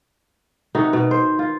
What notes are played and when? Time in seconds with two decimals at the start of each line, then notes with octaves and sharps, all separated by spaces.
0.75 C3 D#3 D#4 F#4
0.93 B2
1.11 C5
1.39 F4